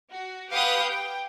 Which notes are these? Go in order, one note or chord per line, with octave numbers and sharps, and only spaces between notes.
F#4
G4 B4 F5 F#5 D#6 G6
G5